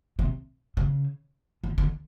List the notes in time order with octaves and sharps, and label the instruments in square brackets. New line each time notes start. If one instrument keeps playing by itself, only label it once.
[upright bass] C3
C#3
D3
D3